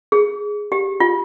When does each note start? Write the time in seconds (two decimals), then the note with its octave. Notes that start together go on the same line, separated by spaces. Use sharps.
0.12 G#4
0.72 G4
1.00 F4